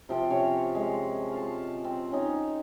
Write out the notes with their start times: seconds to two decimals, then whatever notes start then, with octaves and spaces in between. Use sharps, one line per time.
0.09 C3 F3 G5
0.30 C3 C#4 C#5 F5
0.75 G#3
1.31 F5 A5
1.85 C4
2.12 C#4 D#4